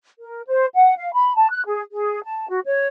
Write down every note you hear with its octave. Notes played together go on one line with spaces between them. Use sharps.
A#4
C5
F#5
F5
B5
A5
F#6
G#4
G#4
A5
F#4
C#5